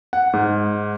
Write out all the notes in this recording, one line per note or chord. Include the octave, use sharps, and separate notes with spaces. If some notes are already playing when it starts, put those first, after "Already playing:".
F#5
G#2